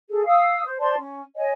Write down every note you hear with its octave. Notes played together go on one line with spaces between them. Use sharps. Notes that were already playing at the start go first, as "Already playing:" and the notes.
G#4 A4
F5 D#6 E6
C5
C5 D5 A5 C6
C#4
C#5 D#5 G#5